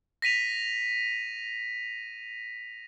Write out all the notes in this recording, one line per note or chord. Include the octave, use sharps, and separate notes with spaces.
A#6 B6 D#7 F7